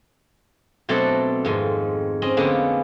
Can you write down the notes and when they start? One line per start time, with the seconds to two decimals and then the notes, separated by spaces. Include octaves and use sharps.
0.89 B2 F#3 A3 C4 D4 A4
1.45 F2 G#2 D#3
2.22 C4 C#4 D#5
2.37 D3 G#3 A#3 B3 C#4